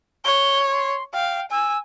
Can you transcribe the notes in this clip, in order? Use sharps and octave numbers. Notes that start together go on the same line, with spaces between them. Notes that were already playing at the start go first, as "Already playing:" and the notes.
C#5 G7
C6
F5 G5
G#5 E6